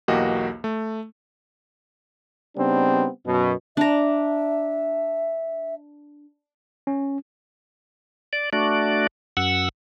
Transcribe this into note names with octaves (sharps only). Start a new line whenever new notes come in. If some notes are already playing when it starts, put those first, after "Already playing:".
B1 E2 A#3 F#4 G4 D#5
A3
C#3 G3 B3 C4 D4 D#4
F#2 B2
D4 E5 A#5
C#4
D5
A3 D4 F#4 D5
F#2 F#5 E6